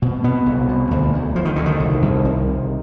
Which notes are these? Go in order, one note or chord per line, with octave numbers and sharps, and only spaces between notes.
B2 C4
B2 B3
C2
B2
D2
D2
D2 F3
D#3
D2 D3
D#3
C2
C2
C2
C3